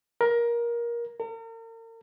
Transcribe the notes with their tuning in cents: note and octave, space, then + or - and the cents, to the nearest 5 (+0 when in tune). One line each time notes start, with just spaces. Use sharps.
A#4 +20
A#4 -40